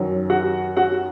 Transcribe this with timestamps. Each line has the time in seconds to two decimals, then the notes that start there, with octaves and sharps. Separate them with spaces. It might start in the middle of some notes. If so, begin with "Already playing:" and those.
Already playing: F#2 D#3 F#3
0.30 F#4 F#5
0.77 F#4 F#5